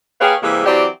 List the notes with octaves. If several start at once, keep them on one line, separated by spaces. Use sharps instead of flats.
A#3 G4 G#4 B4 C#5 F5
C3 E3 G3 G#3 A#3 C4
E3 F#3 C4 G4 D5